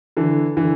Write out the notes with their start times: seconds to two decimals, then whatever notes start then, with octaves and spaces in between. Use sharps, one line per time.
0.17 D3 E3
0.57 D3 E3